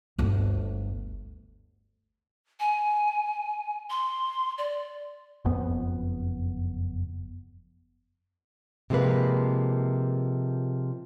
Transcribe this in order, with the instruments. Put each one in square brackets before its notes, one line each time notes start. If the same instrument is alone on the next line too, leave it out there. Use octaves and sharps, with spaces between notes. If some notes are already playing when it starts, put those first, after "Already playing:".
[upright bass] G1 D2
[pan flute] G#5
C6
D5
[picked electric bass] F#1 F2 B3
[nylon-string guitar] C3 F3 G#3 A#3 B4